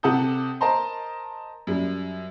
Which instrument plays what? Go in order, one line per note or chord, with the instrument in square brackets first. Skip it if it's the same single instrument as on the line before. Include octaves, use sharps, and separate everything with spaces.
[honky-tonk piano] C3 A4 F#5 A5 D#6 G6
A#4 C5 D#5 A5 A#5 C6
F#2 G3